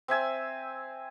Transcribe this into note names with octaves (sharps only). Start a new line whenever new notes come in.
C4 E5 G#5 E6